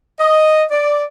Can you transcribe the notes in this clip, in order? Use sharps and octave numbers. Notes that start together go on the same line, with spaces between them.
D#5
D5